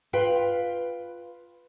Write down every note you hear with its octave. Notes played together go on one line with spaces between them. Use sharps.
F4 B4 G5